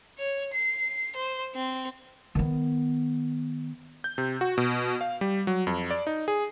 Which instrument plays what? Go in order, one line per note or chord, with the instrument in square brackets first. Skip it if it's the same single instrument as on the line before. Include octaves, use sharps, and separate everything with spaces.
[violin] C#5
C7
C5
C4
[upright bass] D#3 B3
[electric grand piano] G6
C3
F#4
B2
F5
G3
F#3
F2
D5
D#4
G#4